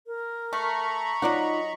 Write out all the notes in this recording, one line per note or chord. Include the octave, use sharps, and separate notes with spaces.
A#4
A3 A#5 B5 C#6
F#3 D#4 F4 D5 D#5 F#5